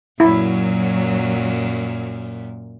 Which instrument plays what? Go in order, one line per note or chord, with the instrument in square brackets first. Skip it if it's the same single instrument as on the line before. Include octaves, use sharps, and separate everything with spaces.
[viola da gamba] F#2 A#2 [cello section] F#3 [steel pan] E4